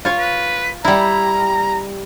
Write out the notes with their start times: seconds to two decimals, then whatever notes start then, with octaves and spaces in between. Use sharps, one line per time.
0.05 F4 C#5
0.18 B4
0.85 G3 E4 A#5